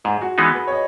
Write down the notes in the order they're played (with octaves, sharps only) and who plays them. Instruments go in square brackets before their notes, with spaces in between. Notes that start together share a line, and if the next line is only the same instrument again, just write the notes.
[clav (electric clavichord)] G#2 [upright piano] G#4
[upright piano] F#4
[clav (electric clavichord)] E3 G#3 B3 D#4 [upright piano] G#4
[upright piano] B4
C#5
D#5